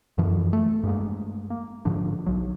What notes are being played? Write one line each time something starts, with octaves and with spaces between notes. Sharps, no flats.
F#2 E3 F3
A3
G2 G#3 A#3
A#3
G#2 D3 F3 D4
B1 F#3